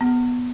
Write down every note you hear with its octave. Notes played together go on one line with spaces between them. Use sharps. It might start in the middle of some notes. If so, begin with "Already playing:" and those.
B3